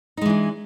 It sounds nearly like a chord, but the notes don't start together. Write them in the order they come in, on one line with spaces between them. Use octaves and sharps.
D#4 G#3 E3 D4